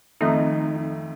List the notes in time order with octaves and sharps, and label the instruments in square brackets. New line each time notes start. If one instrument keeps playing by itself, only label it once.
[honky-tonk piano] F2 A3 [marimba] D#3 C4 F4 [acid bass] D#4